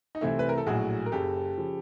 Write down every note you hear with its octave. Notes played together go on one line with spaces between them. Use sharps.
D#4
C2 C3 E3 A3 C4 E4
B4
A#4
A4
A#1 A2 F#3 F#4 G#4
A#4
F#1 F#2 C#3 G4 A4
C#3 F3